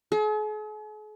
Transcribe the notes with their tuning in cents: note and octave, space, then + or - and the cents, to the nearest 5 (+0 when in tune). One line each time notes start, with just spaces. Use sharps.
G#4 +45